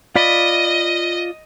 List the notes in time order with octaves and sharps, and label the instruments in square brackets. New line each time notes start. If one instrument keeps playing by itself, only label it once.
[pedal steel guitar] F4 D5 B5 [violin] D#5